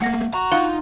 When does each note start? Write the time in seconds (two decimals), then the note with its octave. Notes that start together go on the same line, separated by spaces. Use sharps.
0.02 A3 A#3 F#5 A#6
0.34 F#4 A#5
0.52 D#4 F4 F#5 C6 F#6